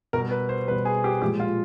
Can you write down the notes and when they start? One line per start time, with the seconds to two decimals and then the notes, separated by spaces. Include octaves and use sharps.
0.13 B2 G3 A#4
0.31 B4
0.49 C5
0.67 G3 B4
0.71 B2
0.85 G#4
1.04 G4
1.22 A#2 F3 G#3 G4
1.40 F4